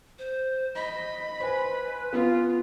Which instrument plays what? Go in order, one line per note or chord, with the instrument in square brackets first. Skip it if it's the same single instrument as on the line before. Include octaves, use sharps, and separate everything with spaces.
[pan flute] C5
[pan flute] D#5 [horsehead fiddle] B5
[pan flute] B4 [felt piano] C5 G#5
[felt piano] B3 [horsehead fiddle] F4